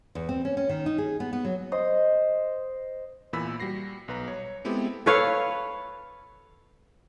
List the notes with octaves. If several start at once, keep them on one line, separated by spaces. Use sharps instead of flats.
E2
C4
C#4
C#4
D#3
D#4
G#4
B3
B3
F#3
C5 D#5 D#6
E2 A#2 E3 B5 E6 B6
G3 F#4 A#6 C7
B1 B4 A#5
C#5
G#3 B3 C4 E4 G4 A4
A4 B4 C#5 F5